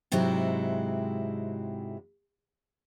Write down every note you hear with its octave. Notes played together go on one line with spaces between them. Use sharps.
G#2 C3 F#3 G#3 C4 E4